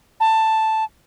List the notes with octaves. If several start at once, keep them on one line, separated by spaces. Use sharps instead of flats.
A5